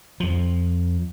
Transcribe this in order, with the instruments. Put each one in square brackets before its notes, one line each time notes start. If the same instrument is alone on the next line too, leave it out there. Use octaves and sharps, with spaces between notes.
[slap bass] F2 F3